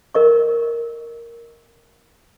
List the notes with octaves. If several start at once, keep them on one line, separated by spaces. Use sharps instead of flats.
A#4 D#5 C#6